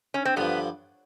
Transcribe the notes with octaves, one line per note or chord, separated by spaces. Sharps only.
C#4
C4
G2 D3 F3 B3